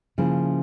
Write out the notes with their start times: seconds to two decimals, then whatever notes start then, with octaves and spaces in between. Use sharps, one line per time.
0.18 C#3 F3 A#3 E4